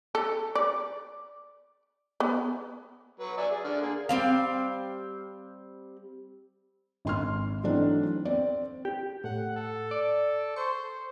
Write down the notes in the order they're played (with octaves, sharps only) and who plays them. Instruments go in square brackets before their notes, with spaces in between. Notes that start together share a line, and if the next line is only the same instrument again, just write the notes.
[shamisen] A4
D5
B3
[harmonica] F#3 B4
D5 E5 G#5
G#4
D3 D5 F6
A#3 G#4
[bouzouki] G3 C4 F5
[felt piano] G#1 C6 F6
E3 F#3 A3 C4 D4 D#4
C4 D5
[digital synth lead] G4
[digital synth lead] A2 [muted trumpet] F#5
[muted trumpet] A4
[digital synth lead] D5
[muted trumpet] C5 [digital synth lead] C#6